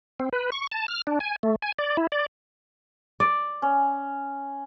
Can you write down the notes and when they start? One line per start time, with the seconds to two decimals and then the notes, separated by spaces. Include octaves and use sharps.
0.20 C4
0.33 B4
0.52 C#6
0.72 A5
0.88 F6
1.07 D4
1.20 G#5
1.43 A3
1.62 G#5
1.79 D5
1.97 E4
2.12 D5
3.20 D5
3.62 C#4